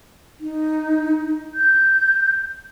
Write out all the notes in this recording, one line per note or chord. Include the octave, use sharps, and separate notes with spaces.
D#4
G6